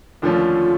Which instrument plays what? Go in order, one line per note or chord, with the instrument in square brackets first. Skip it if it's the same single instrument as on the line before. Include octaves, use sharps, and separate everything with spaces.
[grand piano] D#2 D3 F3 A3 C#4 [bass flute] F4